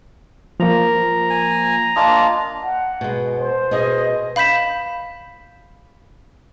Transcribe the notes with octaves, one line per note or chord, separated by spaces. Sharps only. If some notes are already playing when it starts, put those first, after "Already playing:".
F3 A#3 A#5
G#5
A#3 D4 F4 D#5
F#5
B2 G#3
C5
B2 G#4 D#5
F5 B5 G6 B6 E7